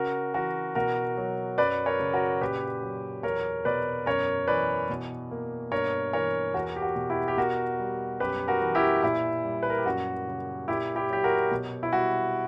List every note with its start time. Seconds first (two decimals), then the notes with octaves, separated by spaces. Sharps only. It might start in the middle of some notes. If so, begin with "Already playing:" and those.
Already playing: C#3 F#4 A#4
0.34 E3 F#4 A#4
0.75 B2 F#4 A#4
1.17 F#3
1.58 F#2 B4 D5
1.86 A#4 C#5
2.00 C#3
2.14 F#4 A#4
2.41 A#2 G4 B4
2.82 F#3
3.23 E2 A#4 C#5
3.65 B2 B4 D5
4.06 F#2 A#4 C#5
4.48 E3 B4 D5
4.89 B2
5.31 A#3
5.72 G2 A#4 C#5
6.13 E3 A#4 C#5
6.54 E2 F#4 A#4
6.76 G4
6.82 F#4
6.96 B2
7.10 E4 G4
7.28 G4
7.37 B2 F#4 A#4
7.79 G3
8.20 F#2 G4 B4
8.48 F#4 A#4
8.62 E3
8.75 E4 G4
9.03 A#2 E4
9.44 G3
9.63 B4
9.70 A#4
9.78 G4
9.85 F#2 F#4
10.27 C#3
10.68 A#2 E4 G4
10.96 E4 G4
11.10 F#3 G4
11.24 F#4 A#4
11.51 B2
11.83 E4
11.93 G3 F#4